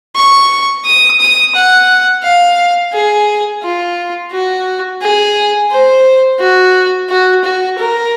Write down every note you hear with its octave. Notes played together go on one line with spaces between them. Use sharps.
C#6
D#6
D#6
F#5
F5
G#4
F4
F#4
G#4
C5
F#4
F#4
F#4
A#4